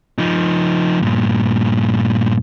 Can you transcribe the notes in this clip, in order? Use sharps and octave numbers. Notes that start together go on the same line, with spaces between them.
F3 D#4
G2 A#2